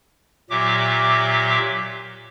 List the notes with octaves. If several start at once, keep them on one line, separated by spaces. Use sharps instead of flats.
A#2 F#3 G4 E5 D6